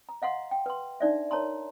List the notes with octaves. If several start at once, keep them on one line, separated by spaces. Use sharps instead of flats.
A#5
D#5 F5 F#5 C6
G5
B4 C6
D4 D#4 D5 E5
A#4 C#5 A5 A#5 C6